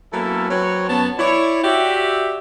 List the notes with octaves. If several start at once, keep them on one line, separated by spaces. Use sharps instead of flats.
F#3 A#3 B3 C#4 E4 A4
F#3 C4 B4 C#5
F#2 B3 C#5 A5
E4 C#5 D5
F#4 G4 D5 E5